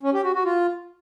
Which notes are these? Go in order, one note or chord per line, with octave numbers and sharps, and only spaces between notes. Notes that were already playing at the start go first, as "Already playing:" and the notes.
C#4
G4
F#4
F#4
F4